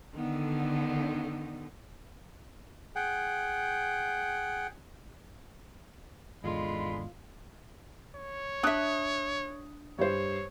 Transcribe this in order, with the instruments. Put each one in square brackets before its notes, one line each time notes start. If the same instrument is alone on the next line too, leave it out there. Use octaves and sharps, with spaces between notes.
[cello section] D3 [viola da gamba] D#3 B3
[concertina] G#4 F#5 G5
[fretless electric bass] G#1 E2 G#2 [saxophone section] D3 G#3 [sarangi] F4 [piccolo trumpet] B5
[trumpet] C#5
[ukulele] D4 E5 [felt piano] D#6 F#6
[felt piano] G2 C5 [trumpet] C#5